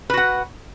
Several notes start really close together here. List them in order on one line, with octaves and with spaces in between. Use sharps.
B4 F#4 F#5